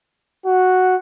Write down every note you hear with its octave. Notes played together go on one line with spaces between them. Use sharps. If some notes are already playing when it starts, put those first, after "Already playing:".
F#4